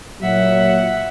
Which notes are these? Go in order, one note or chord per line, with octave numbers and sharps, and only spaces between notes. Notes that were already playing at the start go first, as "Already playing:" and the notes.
A#2 F#3 E5 F#5